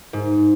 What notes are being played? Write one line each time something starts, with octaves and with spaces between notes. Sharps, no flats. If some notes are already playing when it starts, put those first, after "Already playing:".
G#2